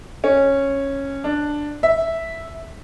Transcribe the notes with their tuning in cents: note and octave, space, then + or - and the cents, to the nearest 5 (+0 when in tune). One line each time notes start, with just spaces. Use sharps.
C#4 -10
D4 +5
E5 -5